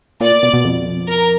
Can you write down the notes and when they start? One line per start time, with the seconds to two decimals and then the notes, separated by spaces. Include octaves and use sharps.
0.20 A#2 D5
0.43 B2
0.53 B2
0.65 F2
1.08 A#4